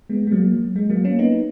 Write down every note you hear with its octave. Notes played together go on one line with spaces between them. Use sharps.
G#3 B3
G#3
F#3 A#3
F#3
G#3
F#3 A#3
A#3 C#4
B3 D#4